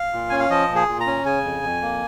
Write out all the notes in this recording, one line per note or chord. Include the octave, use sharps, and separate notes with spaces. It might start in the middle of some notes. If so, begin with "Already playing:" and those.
Already playing: F5
A#2
C#4 G#5
F5
F3 D#5
A#2
G#4
A#2
A#5
C#4
C#3 G#5
F2
F2
A#3